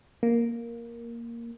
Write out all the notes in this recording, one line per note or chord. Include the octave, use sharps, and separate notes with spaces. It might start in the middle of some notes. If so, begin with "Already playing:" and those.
A#3